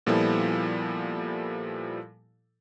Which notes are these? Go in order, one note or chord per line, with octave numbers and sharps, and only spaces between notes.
A#2 F3 G3 B3 E4 A4